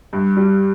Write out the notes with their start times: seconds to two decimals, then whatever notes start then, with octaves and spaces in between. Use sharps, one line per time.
0.13 G2
0.37 G3